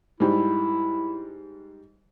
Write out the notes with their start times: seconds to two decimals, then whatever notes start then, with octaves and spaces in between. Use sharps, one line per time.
0.20 G#2 G3 E4